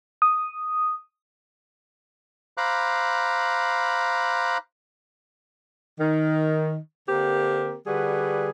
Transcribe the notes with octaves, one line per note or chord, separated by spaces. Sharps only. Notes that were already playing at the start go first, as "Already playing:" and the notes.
D#6
C5 F5 A#5 B5 D6 F#6
D#3
D3 A#3 C4 G4 A#4
D3 G3 F#4 G#4 B4